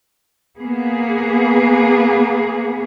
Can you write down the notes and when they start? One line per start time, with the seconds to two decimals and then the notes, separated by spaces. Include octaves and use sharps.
0.58 A#3 B3 G#4